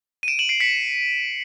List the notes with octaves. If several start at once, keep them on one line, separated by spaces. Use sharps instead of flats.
D#7
D7 E7
E7 F#7
C7 D7
B6 C#7